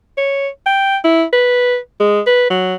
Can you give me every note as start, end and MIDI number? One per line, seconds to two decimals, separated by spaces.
0.17 0.48 73
0.66 0.97 79
1.04 1.24 64
1.33 1.77 71
2.00 2.20 56
2.26 2.47 71
2.50 2.75 54